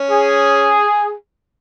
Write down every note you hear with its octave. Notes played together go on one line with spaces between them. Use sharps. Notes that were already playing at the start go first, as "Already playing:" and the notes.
Already playing: C#4
G#4